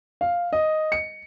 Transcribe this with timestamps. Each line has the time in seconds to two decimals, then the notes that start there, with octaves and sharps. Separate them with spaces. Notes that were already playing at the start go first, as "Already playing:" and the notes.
0.21 F5
0.53 D#5
0.92 C#7